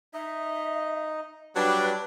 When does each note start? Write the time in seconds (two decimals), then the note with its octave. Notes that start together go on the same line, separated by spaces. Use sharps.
0.14 D#4 D#5 E5
1.56 F#3 G3 D4 G4 B4